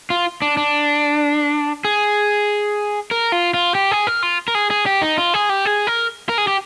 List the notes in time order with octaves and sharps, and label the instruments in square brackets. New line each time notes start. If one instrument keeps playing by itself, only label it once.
[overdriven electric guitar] F4
D4
D4
G#4
A#4
F4
F4
G4
G#4
A#4
F4
A#4
G#4
G#4
G4
D#4
F4
G#4
G4
G#4
A#4
A#4
G#4
G4